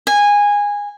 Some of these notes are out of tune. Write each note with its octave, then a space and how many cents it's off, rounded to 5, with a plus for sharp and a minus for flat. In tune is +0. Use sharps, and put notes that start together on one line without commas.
G#5 -15